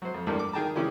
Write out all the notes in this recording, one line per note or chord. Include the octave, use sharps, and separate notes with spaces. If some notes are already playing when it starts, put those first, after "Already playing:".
F#3 C5
F2
E2 G2 G3 A3 A#3 D4
D6
D#3 G#4 G5 A5 A#5
C#3 E3 C#4 E4 G4 G#4